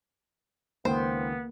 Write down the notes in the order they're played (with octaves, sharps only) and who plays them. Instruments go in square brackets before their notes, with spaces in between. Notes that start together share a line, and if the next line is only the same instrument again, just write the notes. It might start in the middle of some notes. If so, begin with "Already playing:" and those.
[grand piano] C#2 D#3 G5 [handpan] A#3 [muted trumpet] B3 [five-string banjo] C5